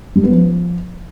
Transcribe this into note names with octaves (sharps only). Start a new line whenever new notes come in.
G3
B3
F3